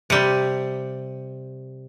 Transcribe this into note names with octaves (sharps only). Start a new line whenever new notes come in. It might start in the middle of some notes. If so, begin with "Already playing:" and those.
C3 G3